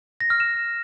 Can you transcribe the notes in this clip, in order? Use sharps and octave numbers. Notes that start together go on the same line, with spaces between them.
A#6
F6
E7